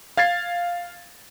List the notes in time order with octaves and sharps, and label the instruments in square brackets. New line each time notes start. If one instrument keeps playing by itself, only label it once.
[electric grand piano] F5 G#6 A6 C7